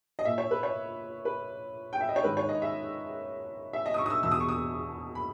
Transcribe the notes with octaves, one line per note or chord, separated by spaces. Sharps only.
D#5
A#2 E5
C#5
B4
C#5
B4
G5
E5
D#5
C#5
G#2 D#3 B4
C#5
D#5
E5
E5
D#5
D#6
C#6
D#6
E6
E2 B2 E6
D#6
C#6
D#6
B5